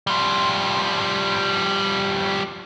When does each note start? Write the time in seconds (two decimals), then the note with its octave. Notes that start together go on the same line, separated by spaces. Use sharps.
0.07 F3 G3